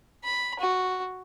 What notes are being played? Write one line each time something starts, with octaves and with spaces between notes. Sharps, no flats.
B5
F#4